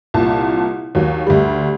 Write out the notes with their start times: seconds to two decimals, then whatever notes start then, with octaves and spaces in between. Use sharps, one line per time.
0.14 C2 A#2 A5
0.95 D#2 F#3
1.27 D2 G3